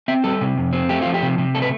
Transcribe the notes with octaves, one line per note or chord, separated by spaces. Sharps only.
C4 E5
G3 A4
C3
F2
C4
A3 G4
F3 F4
G4
C3
C3
A3 A4
B4